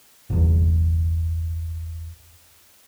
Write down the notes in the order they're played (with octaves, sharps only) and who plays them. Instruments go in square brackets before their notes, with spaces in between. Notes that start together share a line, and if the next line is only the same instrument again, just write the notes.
[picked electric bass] G1 E2